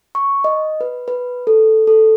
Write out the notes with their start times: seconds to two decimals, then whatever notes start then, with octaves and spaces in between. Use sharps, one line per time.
0.15 C#6
0.44 D#5
0.81 B4
1.08 B4
1.47 A4
1.87 A4